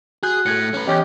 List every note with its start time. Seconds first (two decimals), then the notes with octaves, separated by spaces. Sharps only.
0.23 F#4 G#4 F#6 G6
0.46 A2 A4 G#6 C#7
0.74 C#4 B4
0.88 E2 C#4 G4 D#5 G6